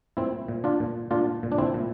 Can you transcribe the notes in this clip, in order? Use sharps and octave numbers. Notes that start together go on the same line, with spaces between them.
A#2 C4 E4
A#2
D4 F4
A#2
A#2 D4 F4
A#2
D4
C4 E4
A#2